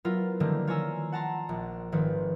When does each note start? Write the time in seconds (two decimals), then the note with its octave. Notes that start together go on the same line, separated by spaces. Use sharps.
0.05 F#3 B3 E4 F4 A#4
0.40 D3 D#3 F3 G3 A3 A#3
0.67 F4 C#5 G#5 A#5 E6
1.12 F#5 A5 A#5 C6
1.49 A#1
1.92 G#1 D#3 F3 C4 B4